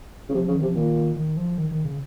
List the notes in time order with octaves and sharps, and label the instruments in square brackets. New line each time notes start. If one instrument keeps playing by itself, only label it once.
[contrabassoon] C#3
[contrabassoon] C3 [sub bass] F3
[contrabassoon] C#3 [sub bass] F3
[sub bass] D#3
[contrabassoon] C3 [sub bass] F3
[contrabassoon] A#2 [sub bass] D#3
[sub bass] D#3
F3
D#3
D#3
C#3